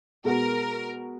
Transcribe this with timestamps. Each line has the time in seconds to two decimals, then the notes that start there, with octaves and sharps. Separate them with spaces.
0.24 B2 G#3 B3 F#4 A#4